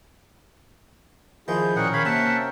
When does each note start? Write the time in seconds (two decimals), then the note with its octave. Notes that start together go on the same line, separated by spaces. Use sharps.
1.48 D#3 F3 E4 G#4 G6
1.76 A#2 C#4 G#4 A#4 F#5 G5
1.93 D#3 C#5 F5 B5
2.05 C3 A#3 E5 F#5 A5